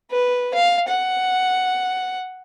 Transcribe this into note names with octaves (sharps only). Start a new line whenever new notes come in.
B4
F5
F#5